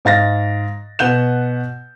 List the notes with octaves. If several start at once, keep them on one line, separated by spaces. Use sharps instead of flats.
G#2 F5 A6 A#6
B2 B4 F#5 G6 E7